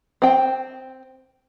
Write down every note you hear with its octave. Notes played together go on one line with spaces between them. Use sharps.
C4 G5